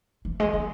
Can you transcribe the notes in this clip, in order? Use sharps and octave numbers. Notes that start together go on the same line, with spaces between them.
E3
G#3
A#3